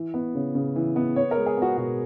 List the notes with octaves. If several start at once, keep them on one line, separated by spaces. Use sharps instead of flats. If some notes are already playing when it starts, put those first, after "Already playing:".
Already playing: E3
B3
C#3
C#3
E3
B3
B3 C#5
A#4
G#3
G#4
B3 F#4
B2 F#4